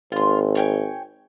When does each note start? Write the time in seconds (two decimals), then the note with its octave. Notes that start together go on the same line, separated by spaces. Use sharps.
0.12 G#1 F4 C6
0.55 C#5 G5 G#5